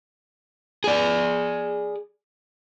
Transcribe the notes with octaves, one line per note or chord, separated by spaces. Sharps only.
G#4 D5